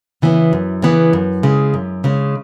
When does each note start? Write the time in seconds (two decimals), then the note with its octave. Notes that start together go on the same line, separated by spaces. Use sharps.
0.22 C#3 E3 B3
0.53 F#2
0.82 C#3 E3 B3
1.13 F#2
1.43 C#3 G#3
1.74 F#2
2.04 C#3 G#3